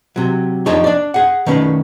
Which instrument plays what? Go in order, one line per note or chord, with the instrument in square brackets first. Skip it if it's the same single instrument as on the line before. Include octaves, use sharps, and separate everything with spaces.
[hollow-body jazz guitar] C3 F#3
F2 F3 D4 D#4 G4 C#5
D4 D5
G#4 F#5
D#3 A3 C#4 B4